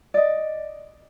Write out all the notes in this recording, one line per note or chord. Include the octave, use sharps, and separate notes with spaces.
D5 D#5